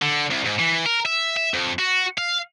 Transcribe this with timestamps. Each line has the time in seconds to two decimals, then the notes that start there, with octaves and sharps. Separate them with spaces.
0.02 D3
0.31 C2
0.45 G#2
0.59 E3
0.86 A#4
1.06 E5
1.37 E5
1.54 F2
1.79 F#4
2.18 F5